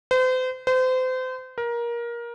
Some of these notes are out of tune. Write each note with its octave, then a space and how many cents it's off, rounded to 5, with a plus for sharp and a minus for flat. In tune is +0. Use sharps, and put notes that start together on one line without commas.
C5 -40
C5 -35
A#4 +20